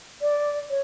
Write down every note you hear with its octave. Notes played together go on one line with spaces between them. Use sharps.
D5
C#5